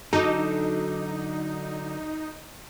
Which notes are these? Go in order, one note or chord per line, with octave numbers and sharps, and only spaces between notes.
D3 F#3 D#4 F#4 A4 D6